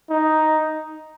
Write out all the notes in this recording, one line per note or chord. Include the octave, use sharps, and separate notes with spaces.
D#4